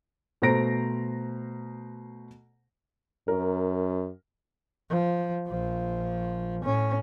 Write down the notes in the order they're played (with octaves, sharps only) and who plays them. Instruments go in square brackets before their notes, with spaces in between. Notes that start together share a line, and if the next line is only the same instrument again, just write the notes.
[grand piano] B2 A3 C5 A#5 A#6 D7
[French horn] F#2 [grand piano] A#4
[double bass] F3
A#1 F3
A2 C#4